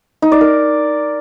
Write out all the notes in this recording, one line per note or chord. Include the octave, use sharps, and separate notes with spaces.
D#4
D5
A#4